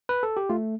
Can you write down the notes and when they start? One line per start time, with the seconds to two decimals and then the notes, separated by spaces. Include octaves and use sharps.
0.09 B4
0.23 A4
0.37 G4
0.49 A3 F4